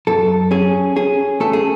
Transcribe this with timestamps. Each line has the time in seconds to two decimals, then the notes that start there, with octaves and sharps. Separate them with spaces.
0.07 F#2 A4
0.51 C#4 G#4
0.96 C#4 G#4
1.40 A3 A4
1.53 G#4